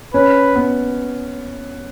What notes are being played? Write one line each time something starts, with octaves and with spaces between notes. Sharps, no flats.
C#4 B4
B3